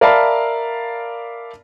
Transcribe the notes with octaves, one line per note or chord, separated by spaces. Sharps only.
A#4 D5 E5 F5 A5 B5